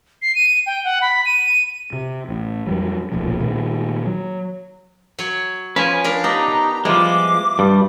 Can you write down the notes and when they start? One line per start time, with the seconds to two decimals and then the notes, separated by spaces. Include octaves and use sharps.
0.22 C7
0.35 D#7
0.66 G5
0.84 F#5
1.02 B5
1.25 D#7
1.93 C3
2.29 A1
2.67 F2 F#3 G3
3.12 D1 B1 A#2 F3
3.40 A#2 D#3 G#3
4.06 F#3
5.19 F#3 C#5
5.76 F3 C#4 B4 G#5
6.04 D4 A#4
6.24 B3 D#4 G4 A#5
6.85 E3 F3 G3 G#3 F4 D6
7.59 G2 G3